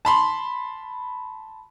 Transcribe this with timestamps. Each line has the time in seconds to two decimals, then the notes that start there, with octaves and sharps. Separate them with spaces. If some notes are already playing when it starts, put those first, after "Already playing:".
0.05 A5 B5 C6